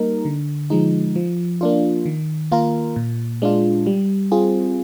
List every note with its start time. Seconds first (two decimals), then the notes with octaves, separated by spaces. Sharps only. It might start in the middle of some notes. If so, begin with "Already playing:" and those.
Already playing: G3 A#3 D#4 A#4
0.25 D3
0.70 F3 G#3 D#4
1.16 F3
1.61 A#3 D4 F4
2.06 D#3
2.52 A#3 F4 A#4
2.96 A#2
3.42 G#3 D4 F4
3.86 G3
4.32 C4 F4 G#4